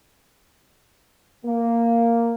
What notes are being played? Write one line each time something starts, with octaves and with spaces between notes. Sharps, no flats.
A#3